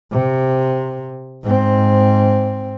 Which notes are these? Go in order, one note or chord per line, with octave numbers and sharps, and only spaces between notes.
C3
G#2 C4